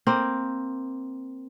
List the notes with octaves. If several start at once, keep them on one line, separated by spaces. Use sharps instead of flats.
A#3 C4